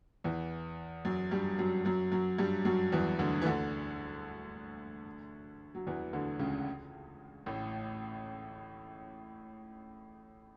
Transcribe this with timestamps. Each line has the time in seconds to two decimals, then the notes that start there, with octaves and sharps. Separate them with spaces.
0.24 E2 E3
1.05 F#2 F#3
1.31 G2 G3
1.58 F#2 F#3
1.85 F#2 F#3
2.12 F#2 F#3
2.38 G2 G3
2.65 F#2 F#3
2.92 E2 E3
3.19 D2 D3
3.42 E3
3.45 D2 D3
5.75 F#3
5.87 E2 E3
6.13 D2 D3
6.39 C#2 C#3
7.46 A1 A2